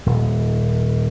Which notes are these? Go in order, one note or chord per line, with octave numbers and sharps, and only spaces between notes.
D#1